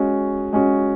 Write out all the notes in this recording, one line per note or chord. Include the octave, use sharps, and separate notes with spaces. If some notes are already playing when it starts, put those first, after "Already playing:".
Already playing: G#3 C#4 F#4
G#3 C#4 F#4